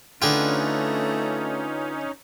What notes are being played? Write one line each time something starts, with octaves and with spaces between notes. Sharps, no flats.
D3 A3 C#4 D#4 F4 G#4 B4 G5